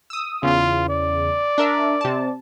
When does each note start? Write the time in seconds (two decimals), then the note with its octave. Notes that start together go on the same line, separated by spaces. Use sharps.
0.10 D#6 E6
0.43 E2 C#3 F4
0.89 D5
1.58 D4 A#4 E5
2.01 C3 A5